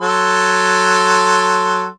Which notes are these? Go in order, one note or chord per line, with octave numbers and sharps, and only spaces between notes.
F#3 A4 C6